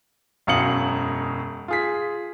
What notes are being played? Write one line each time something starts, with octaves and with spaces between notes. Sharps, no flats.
E1 F#2 F5 D#6 C#7 F#7
F4 G#4 B6